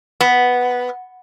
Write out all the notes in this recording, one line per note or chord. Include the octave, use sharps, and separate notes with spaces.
B3